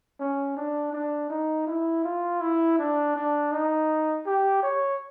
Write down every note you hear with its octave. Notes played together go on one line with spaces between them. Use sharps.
C#4
D4
D4
D#4
E4
F4
E4
D4
D4
D#4
G4
C#5